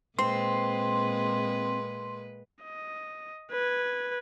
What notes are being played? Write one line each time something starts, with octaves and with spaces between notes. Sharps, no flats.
A#2 G#3 C4 B4 C6
D#5
B4 G#6